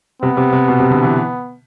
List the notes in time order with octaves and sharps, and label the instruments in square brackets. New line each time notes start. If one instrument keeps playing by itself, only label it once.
[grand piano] C3 [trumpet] B3
[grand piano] C3
C3
B2
C3
D3
E3